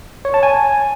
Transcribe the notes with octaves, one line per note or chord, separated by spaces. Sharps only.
C#5
A5
G#5